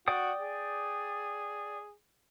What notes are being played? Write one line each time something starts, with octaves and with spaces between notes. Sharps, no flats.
F#4 D5 G5 D#6
G#4